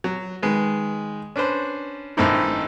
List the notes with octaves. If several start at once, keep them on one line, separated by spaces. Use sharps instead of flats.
F#3
D#3 G#3 B4
C#4 D4 B4 C5
G#1 G2 A3 C4 D#4 E4